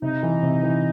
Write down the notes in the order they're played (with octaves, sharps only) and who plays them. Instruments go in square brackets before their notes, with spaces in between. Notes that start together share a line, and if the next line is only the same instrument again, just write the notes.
[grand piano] C3 [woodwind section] D#4
[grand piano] E3
C3
E3